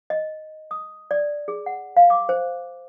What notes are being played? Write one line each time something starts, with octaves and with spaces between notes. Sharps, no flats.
D#5
D#6
D5
G#4
F#5
F5
D6
C5